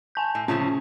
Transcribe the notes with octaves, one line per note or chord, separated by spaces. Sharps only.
G#5 A5 G6
A2
A2 C#3 F3 C#4